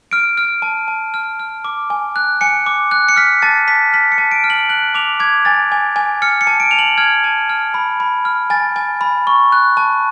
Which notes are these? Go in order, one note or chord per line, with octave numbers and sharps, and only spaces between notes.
F6 D7
F6
A5
A5
F6
F6
D6
G#5
F#6
G#5 C#7
D6
F#6
C#7
F6 B6
A5 A6
A5 B6
F6 B6
C#7
A5
D7
F6
F#7
F#6 F#7
D6 F7
D6 G#6
G#5 A6
G#5
G#5
F6 C#7
C#7
A5
D7
A5 F7
F#7
F6 G#6
A5
F6
B5
B5
F6
G#5 A6
G#5
B5
C#6
F#6
A5